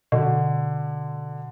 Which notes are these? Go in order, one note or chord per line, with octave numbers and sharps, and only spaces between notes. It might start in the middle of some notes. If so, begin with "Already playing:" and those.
B2 D3